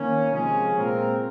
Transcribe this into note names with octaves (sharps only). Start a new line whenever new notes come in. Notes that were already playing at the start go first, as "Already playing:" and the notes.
Already playing: D#3 A#3 C#4
C3 F3 G#3 C#4 G#4
A#2 G#3 C4 F4 A#4